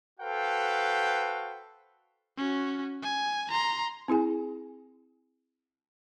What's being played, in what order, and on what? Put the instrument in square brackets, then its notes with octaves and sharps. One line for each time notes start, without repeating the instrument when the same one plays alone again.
[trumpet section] F#4 A4 B4 C5 F5 G5
[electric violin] C#4 F#4
G#5
A#5 C6
[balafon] C4 E4 G#4 G#5